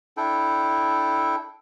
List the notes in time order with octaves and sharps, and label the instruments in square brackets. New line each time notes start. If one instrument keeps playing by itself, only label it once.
[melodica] D4 E4 A4 G5